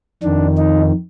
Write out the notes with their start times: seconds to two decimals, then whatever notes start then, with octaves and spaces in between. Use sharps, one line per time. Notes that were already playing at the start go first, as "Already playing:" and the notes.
0.23 F2 D#3 D4
0.57 D#4